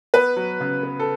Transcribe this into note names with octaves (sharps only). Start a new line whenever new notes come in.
B3 B4
F#3
C#3
B3
A4